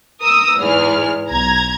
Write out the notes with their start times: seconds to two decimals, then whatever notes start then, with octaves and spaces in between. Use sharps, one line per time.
0.21 A#4 D#6 E6
0.57 E2 G#2 G#4 F6
1.28 B1 A#5 G#6